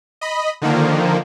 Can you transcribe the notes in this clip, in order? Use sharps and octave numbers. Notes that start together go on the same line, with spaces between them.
D#5 B5
D3 D#3 F3 A#3